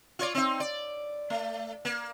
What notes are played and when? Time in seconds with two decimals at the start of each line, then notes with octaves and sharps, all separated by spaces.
0.19 F4 C#5 D5
0.35 C4 D#4
0.60 D5
1.30 A3
1.85 A#3